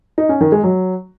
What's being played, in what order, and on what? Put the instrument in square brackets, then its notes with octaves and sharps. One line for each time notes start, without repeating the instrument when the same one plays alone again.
[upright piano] D#4
C#4
D#3
G#3
F#3